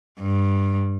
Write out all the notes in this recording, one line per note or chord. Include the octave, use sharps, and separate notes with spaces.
G2